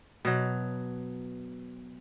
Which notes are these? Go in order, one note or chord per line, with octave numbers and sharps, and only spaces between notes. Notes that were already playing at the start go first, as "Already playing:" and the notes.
B2 F#3